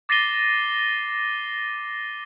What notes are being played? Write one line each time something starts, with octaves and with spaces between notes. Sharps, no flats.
D6 A6 A#6 C7 D#7 G7